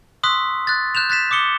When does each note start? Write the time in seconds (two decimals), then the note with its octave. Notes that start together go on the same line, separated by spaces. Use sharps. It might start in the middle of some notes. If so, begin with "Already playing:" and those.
0.23 C6 C#6 D#6 E6 F#6 B6
0.67 F#6 A6
0.95 F#6 G6 E7 F7
1.10 F#6 A6 B6 E7
1.31 D6 D#6 C#7 G7